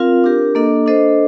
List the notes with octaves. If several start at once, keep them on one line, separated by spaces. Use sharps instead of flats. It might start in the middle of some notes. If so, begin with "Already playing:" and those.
Already playing: C4 F4 A#4 F5
D4 G4 A#4
A#3 D4 A4 D#5
D4 A4 C5 D#5